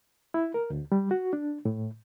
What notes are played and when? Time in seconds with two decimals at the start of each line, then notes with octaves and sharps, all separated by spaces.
0.34 E4
0.54 A#4
0.70 D2
0.92 G3
1.11 F#4
1.33 D4
1.65 A2